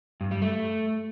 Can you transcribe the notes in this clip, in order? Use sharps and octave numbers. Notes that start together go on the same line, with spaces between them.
G2
G3
A3